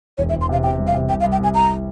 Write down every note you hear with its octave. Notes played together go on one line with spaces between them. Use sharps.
E1 C#5
E5
E1
C6
C3 F5
C3 G5
G3
F5
C3
C2 G5
F5
C2
G5
C3 G#5
C2 A#5